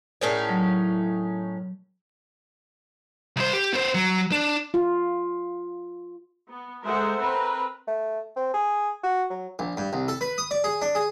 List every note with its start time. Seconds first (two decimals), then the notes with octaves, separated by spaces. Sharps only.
0.21 A2 C#4 D#4 G#4 A#4 D5
0.49 F#3
3.36 C2 C5
3.53 G4
3.74 B3 C5
3.95 F#3
4.32 D4
4.74 F4
6.47 B3
6.85 G#3 A4 A#4 C5 E5 F#5
7.21 C4 A#4 B4
7.87 A3
8.36 C4
8.54 G#4
9.04 F#4
9.30 F#3
9.59 A#1
9.77 G2
9.93 C2
10.08 A4
10.21 B4
10.38 D#6
10.51 D5
10.64 G#4
10.82 D4
10.95 G#4